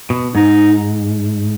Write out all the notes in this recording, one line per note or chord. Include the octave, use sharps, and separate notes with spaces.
B2
G#2 D#4